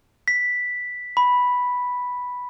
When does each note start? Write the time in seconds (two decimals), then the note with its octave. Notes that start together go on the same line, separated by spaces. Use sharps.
0.28 B6
1.17 B5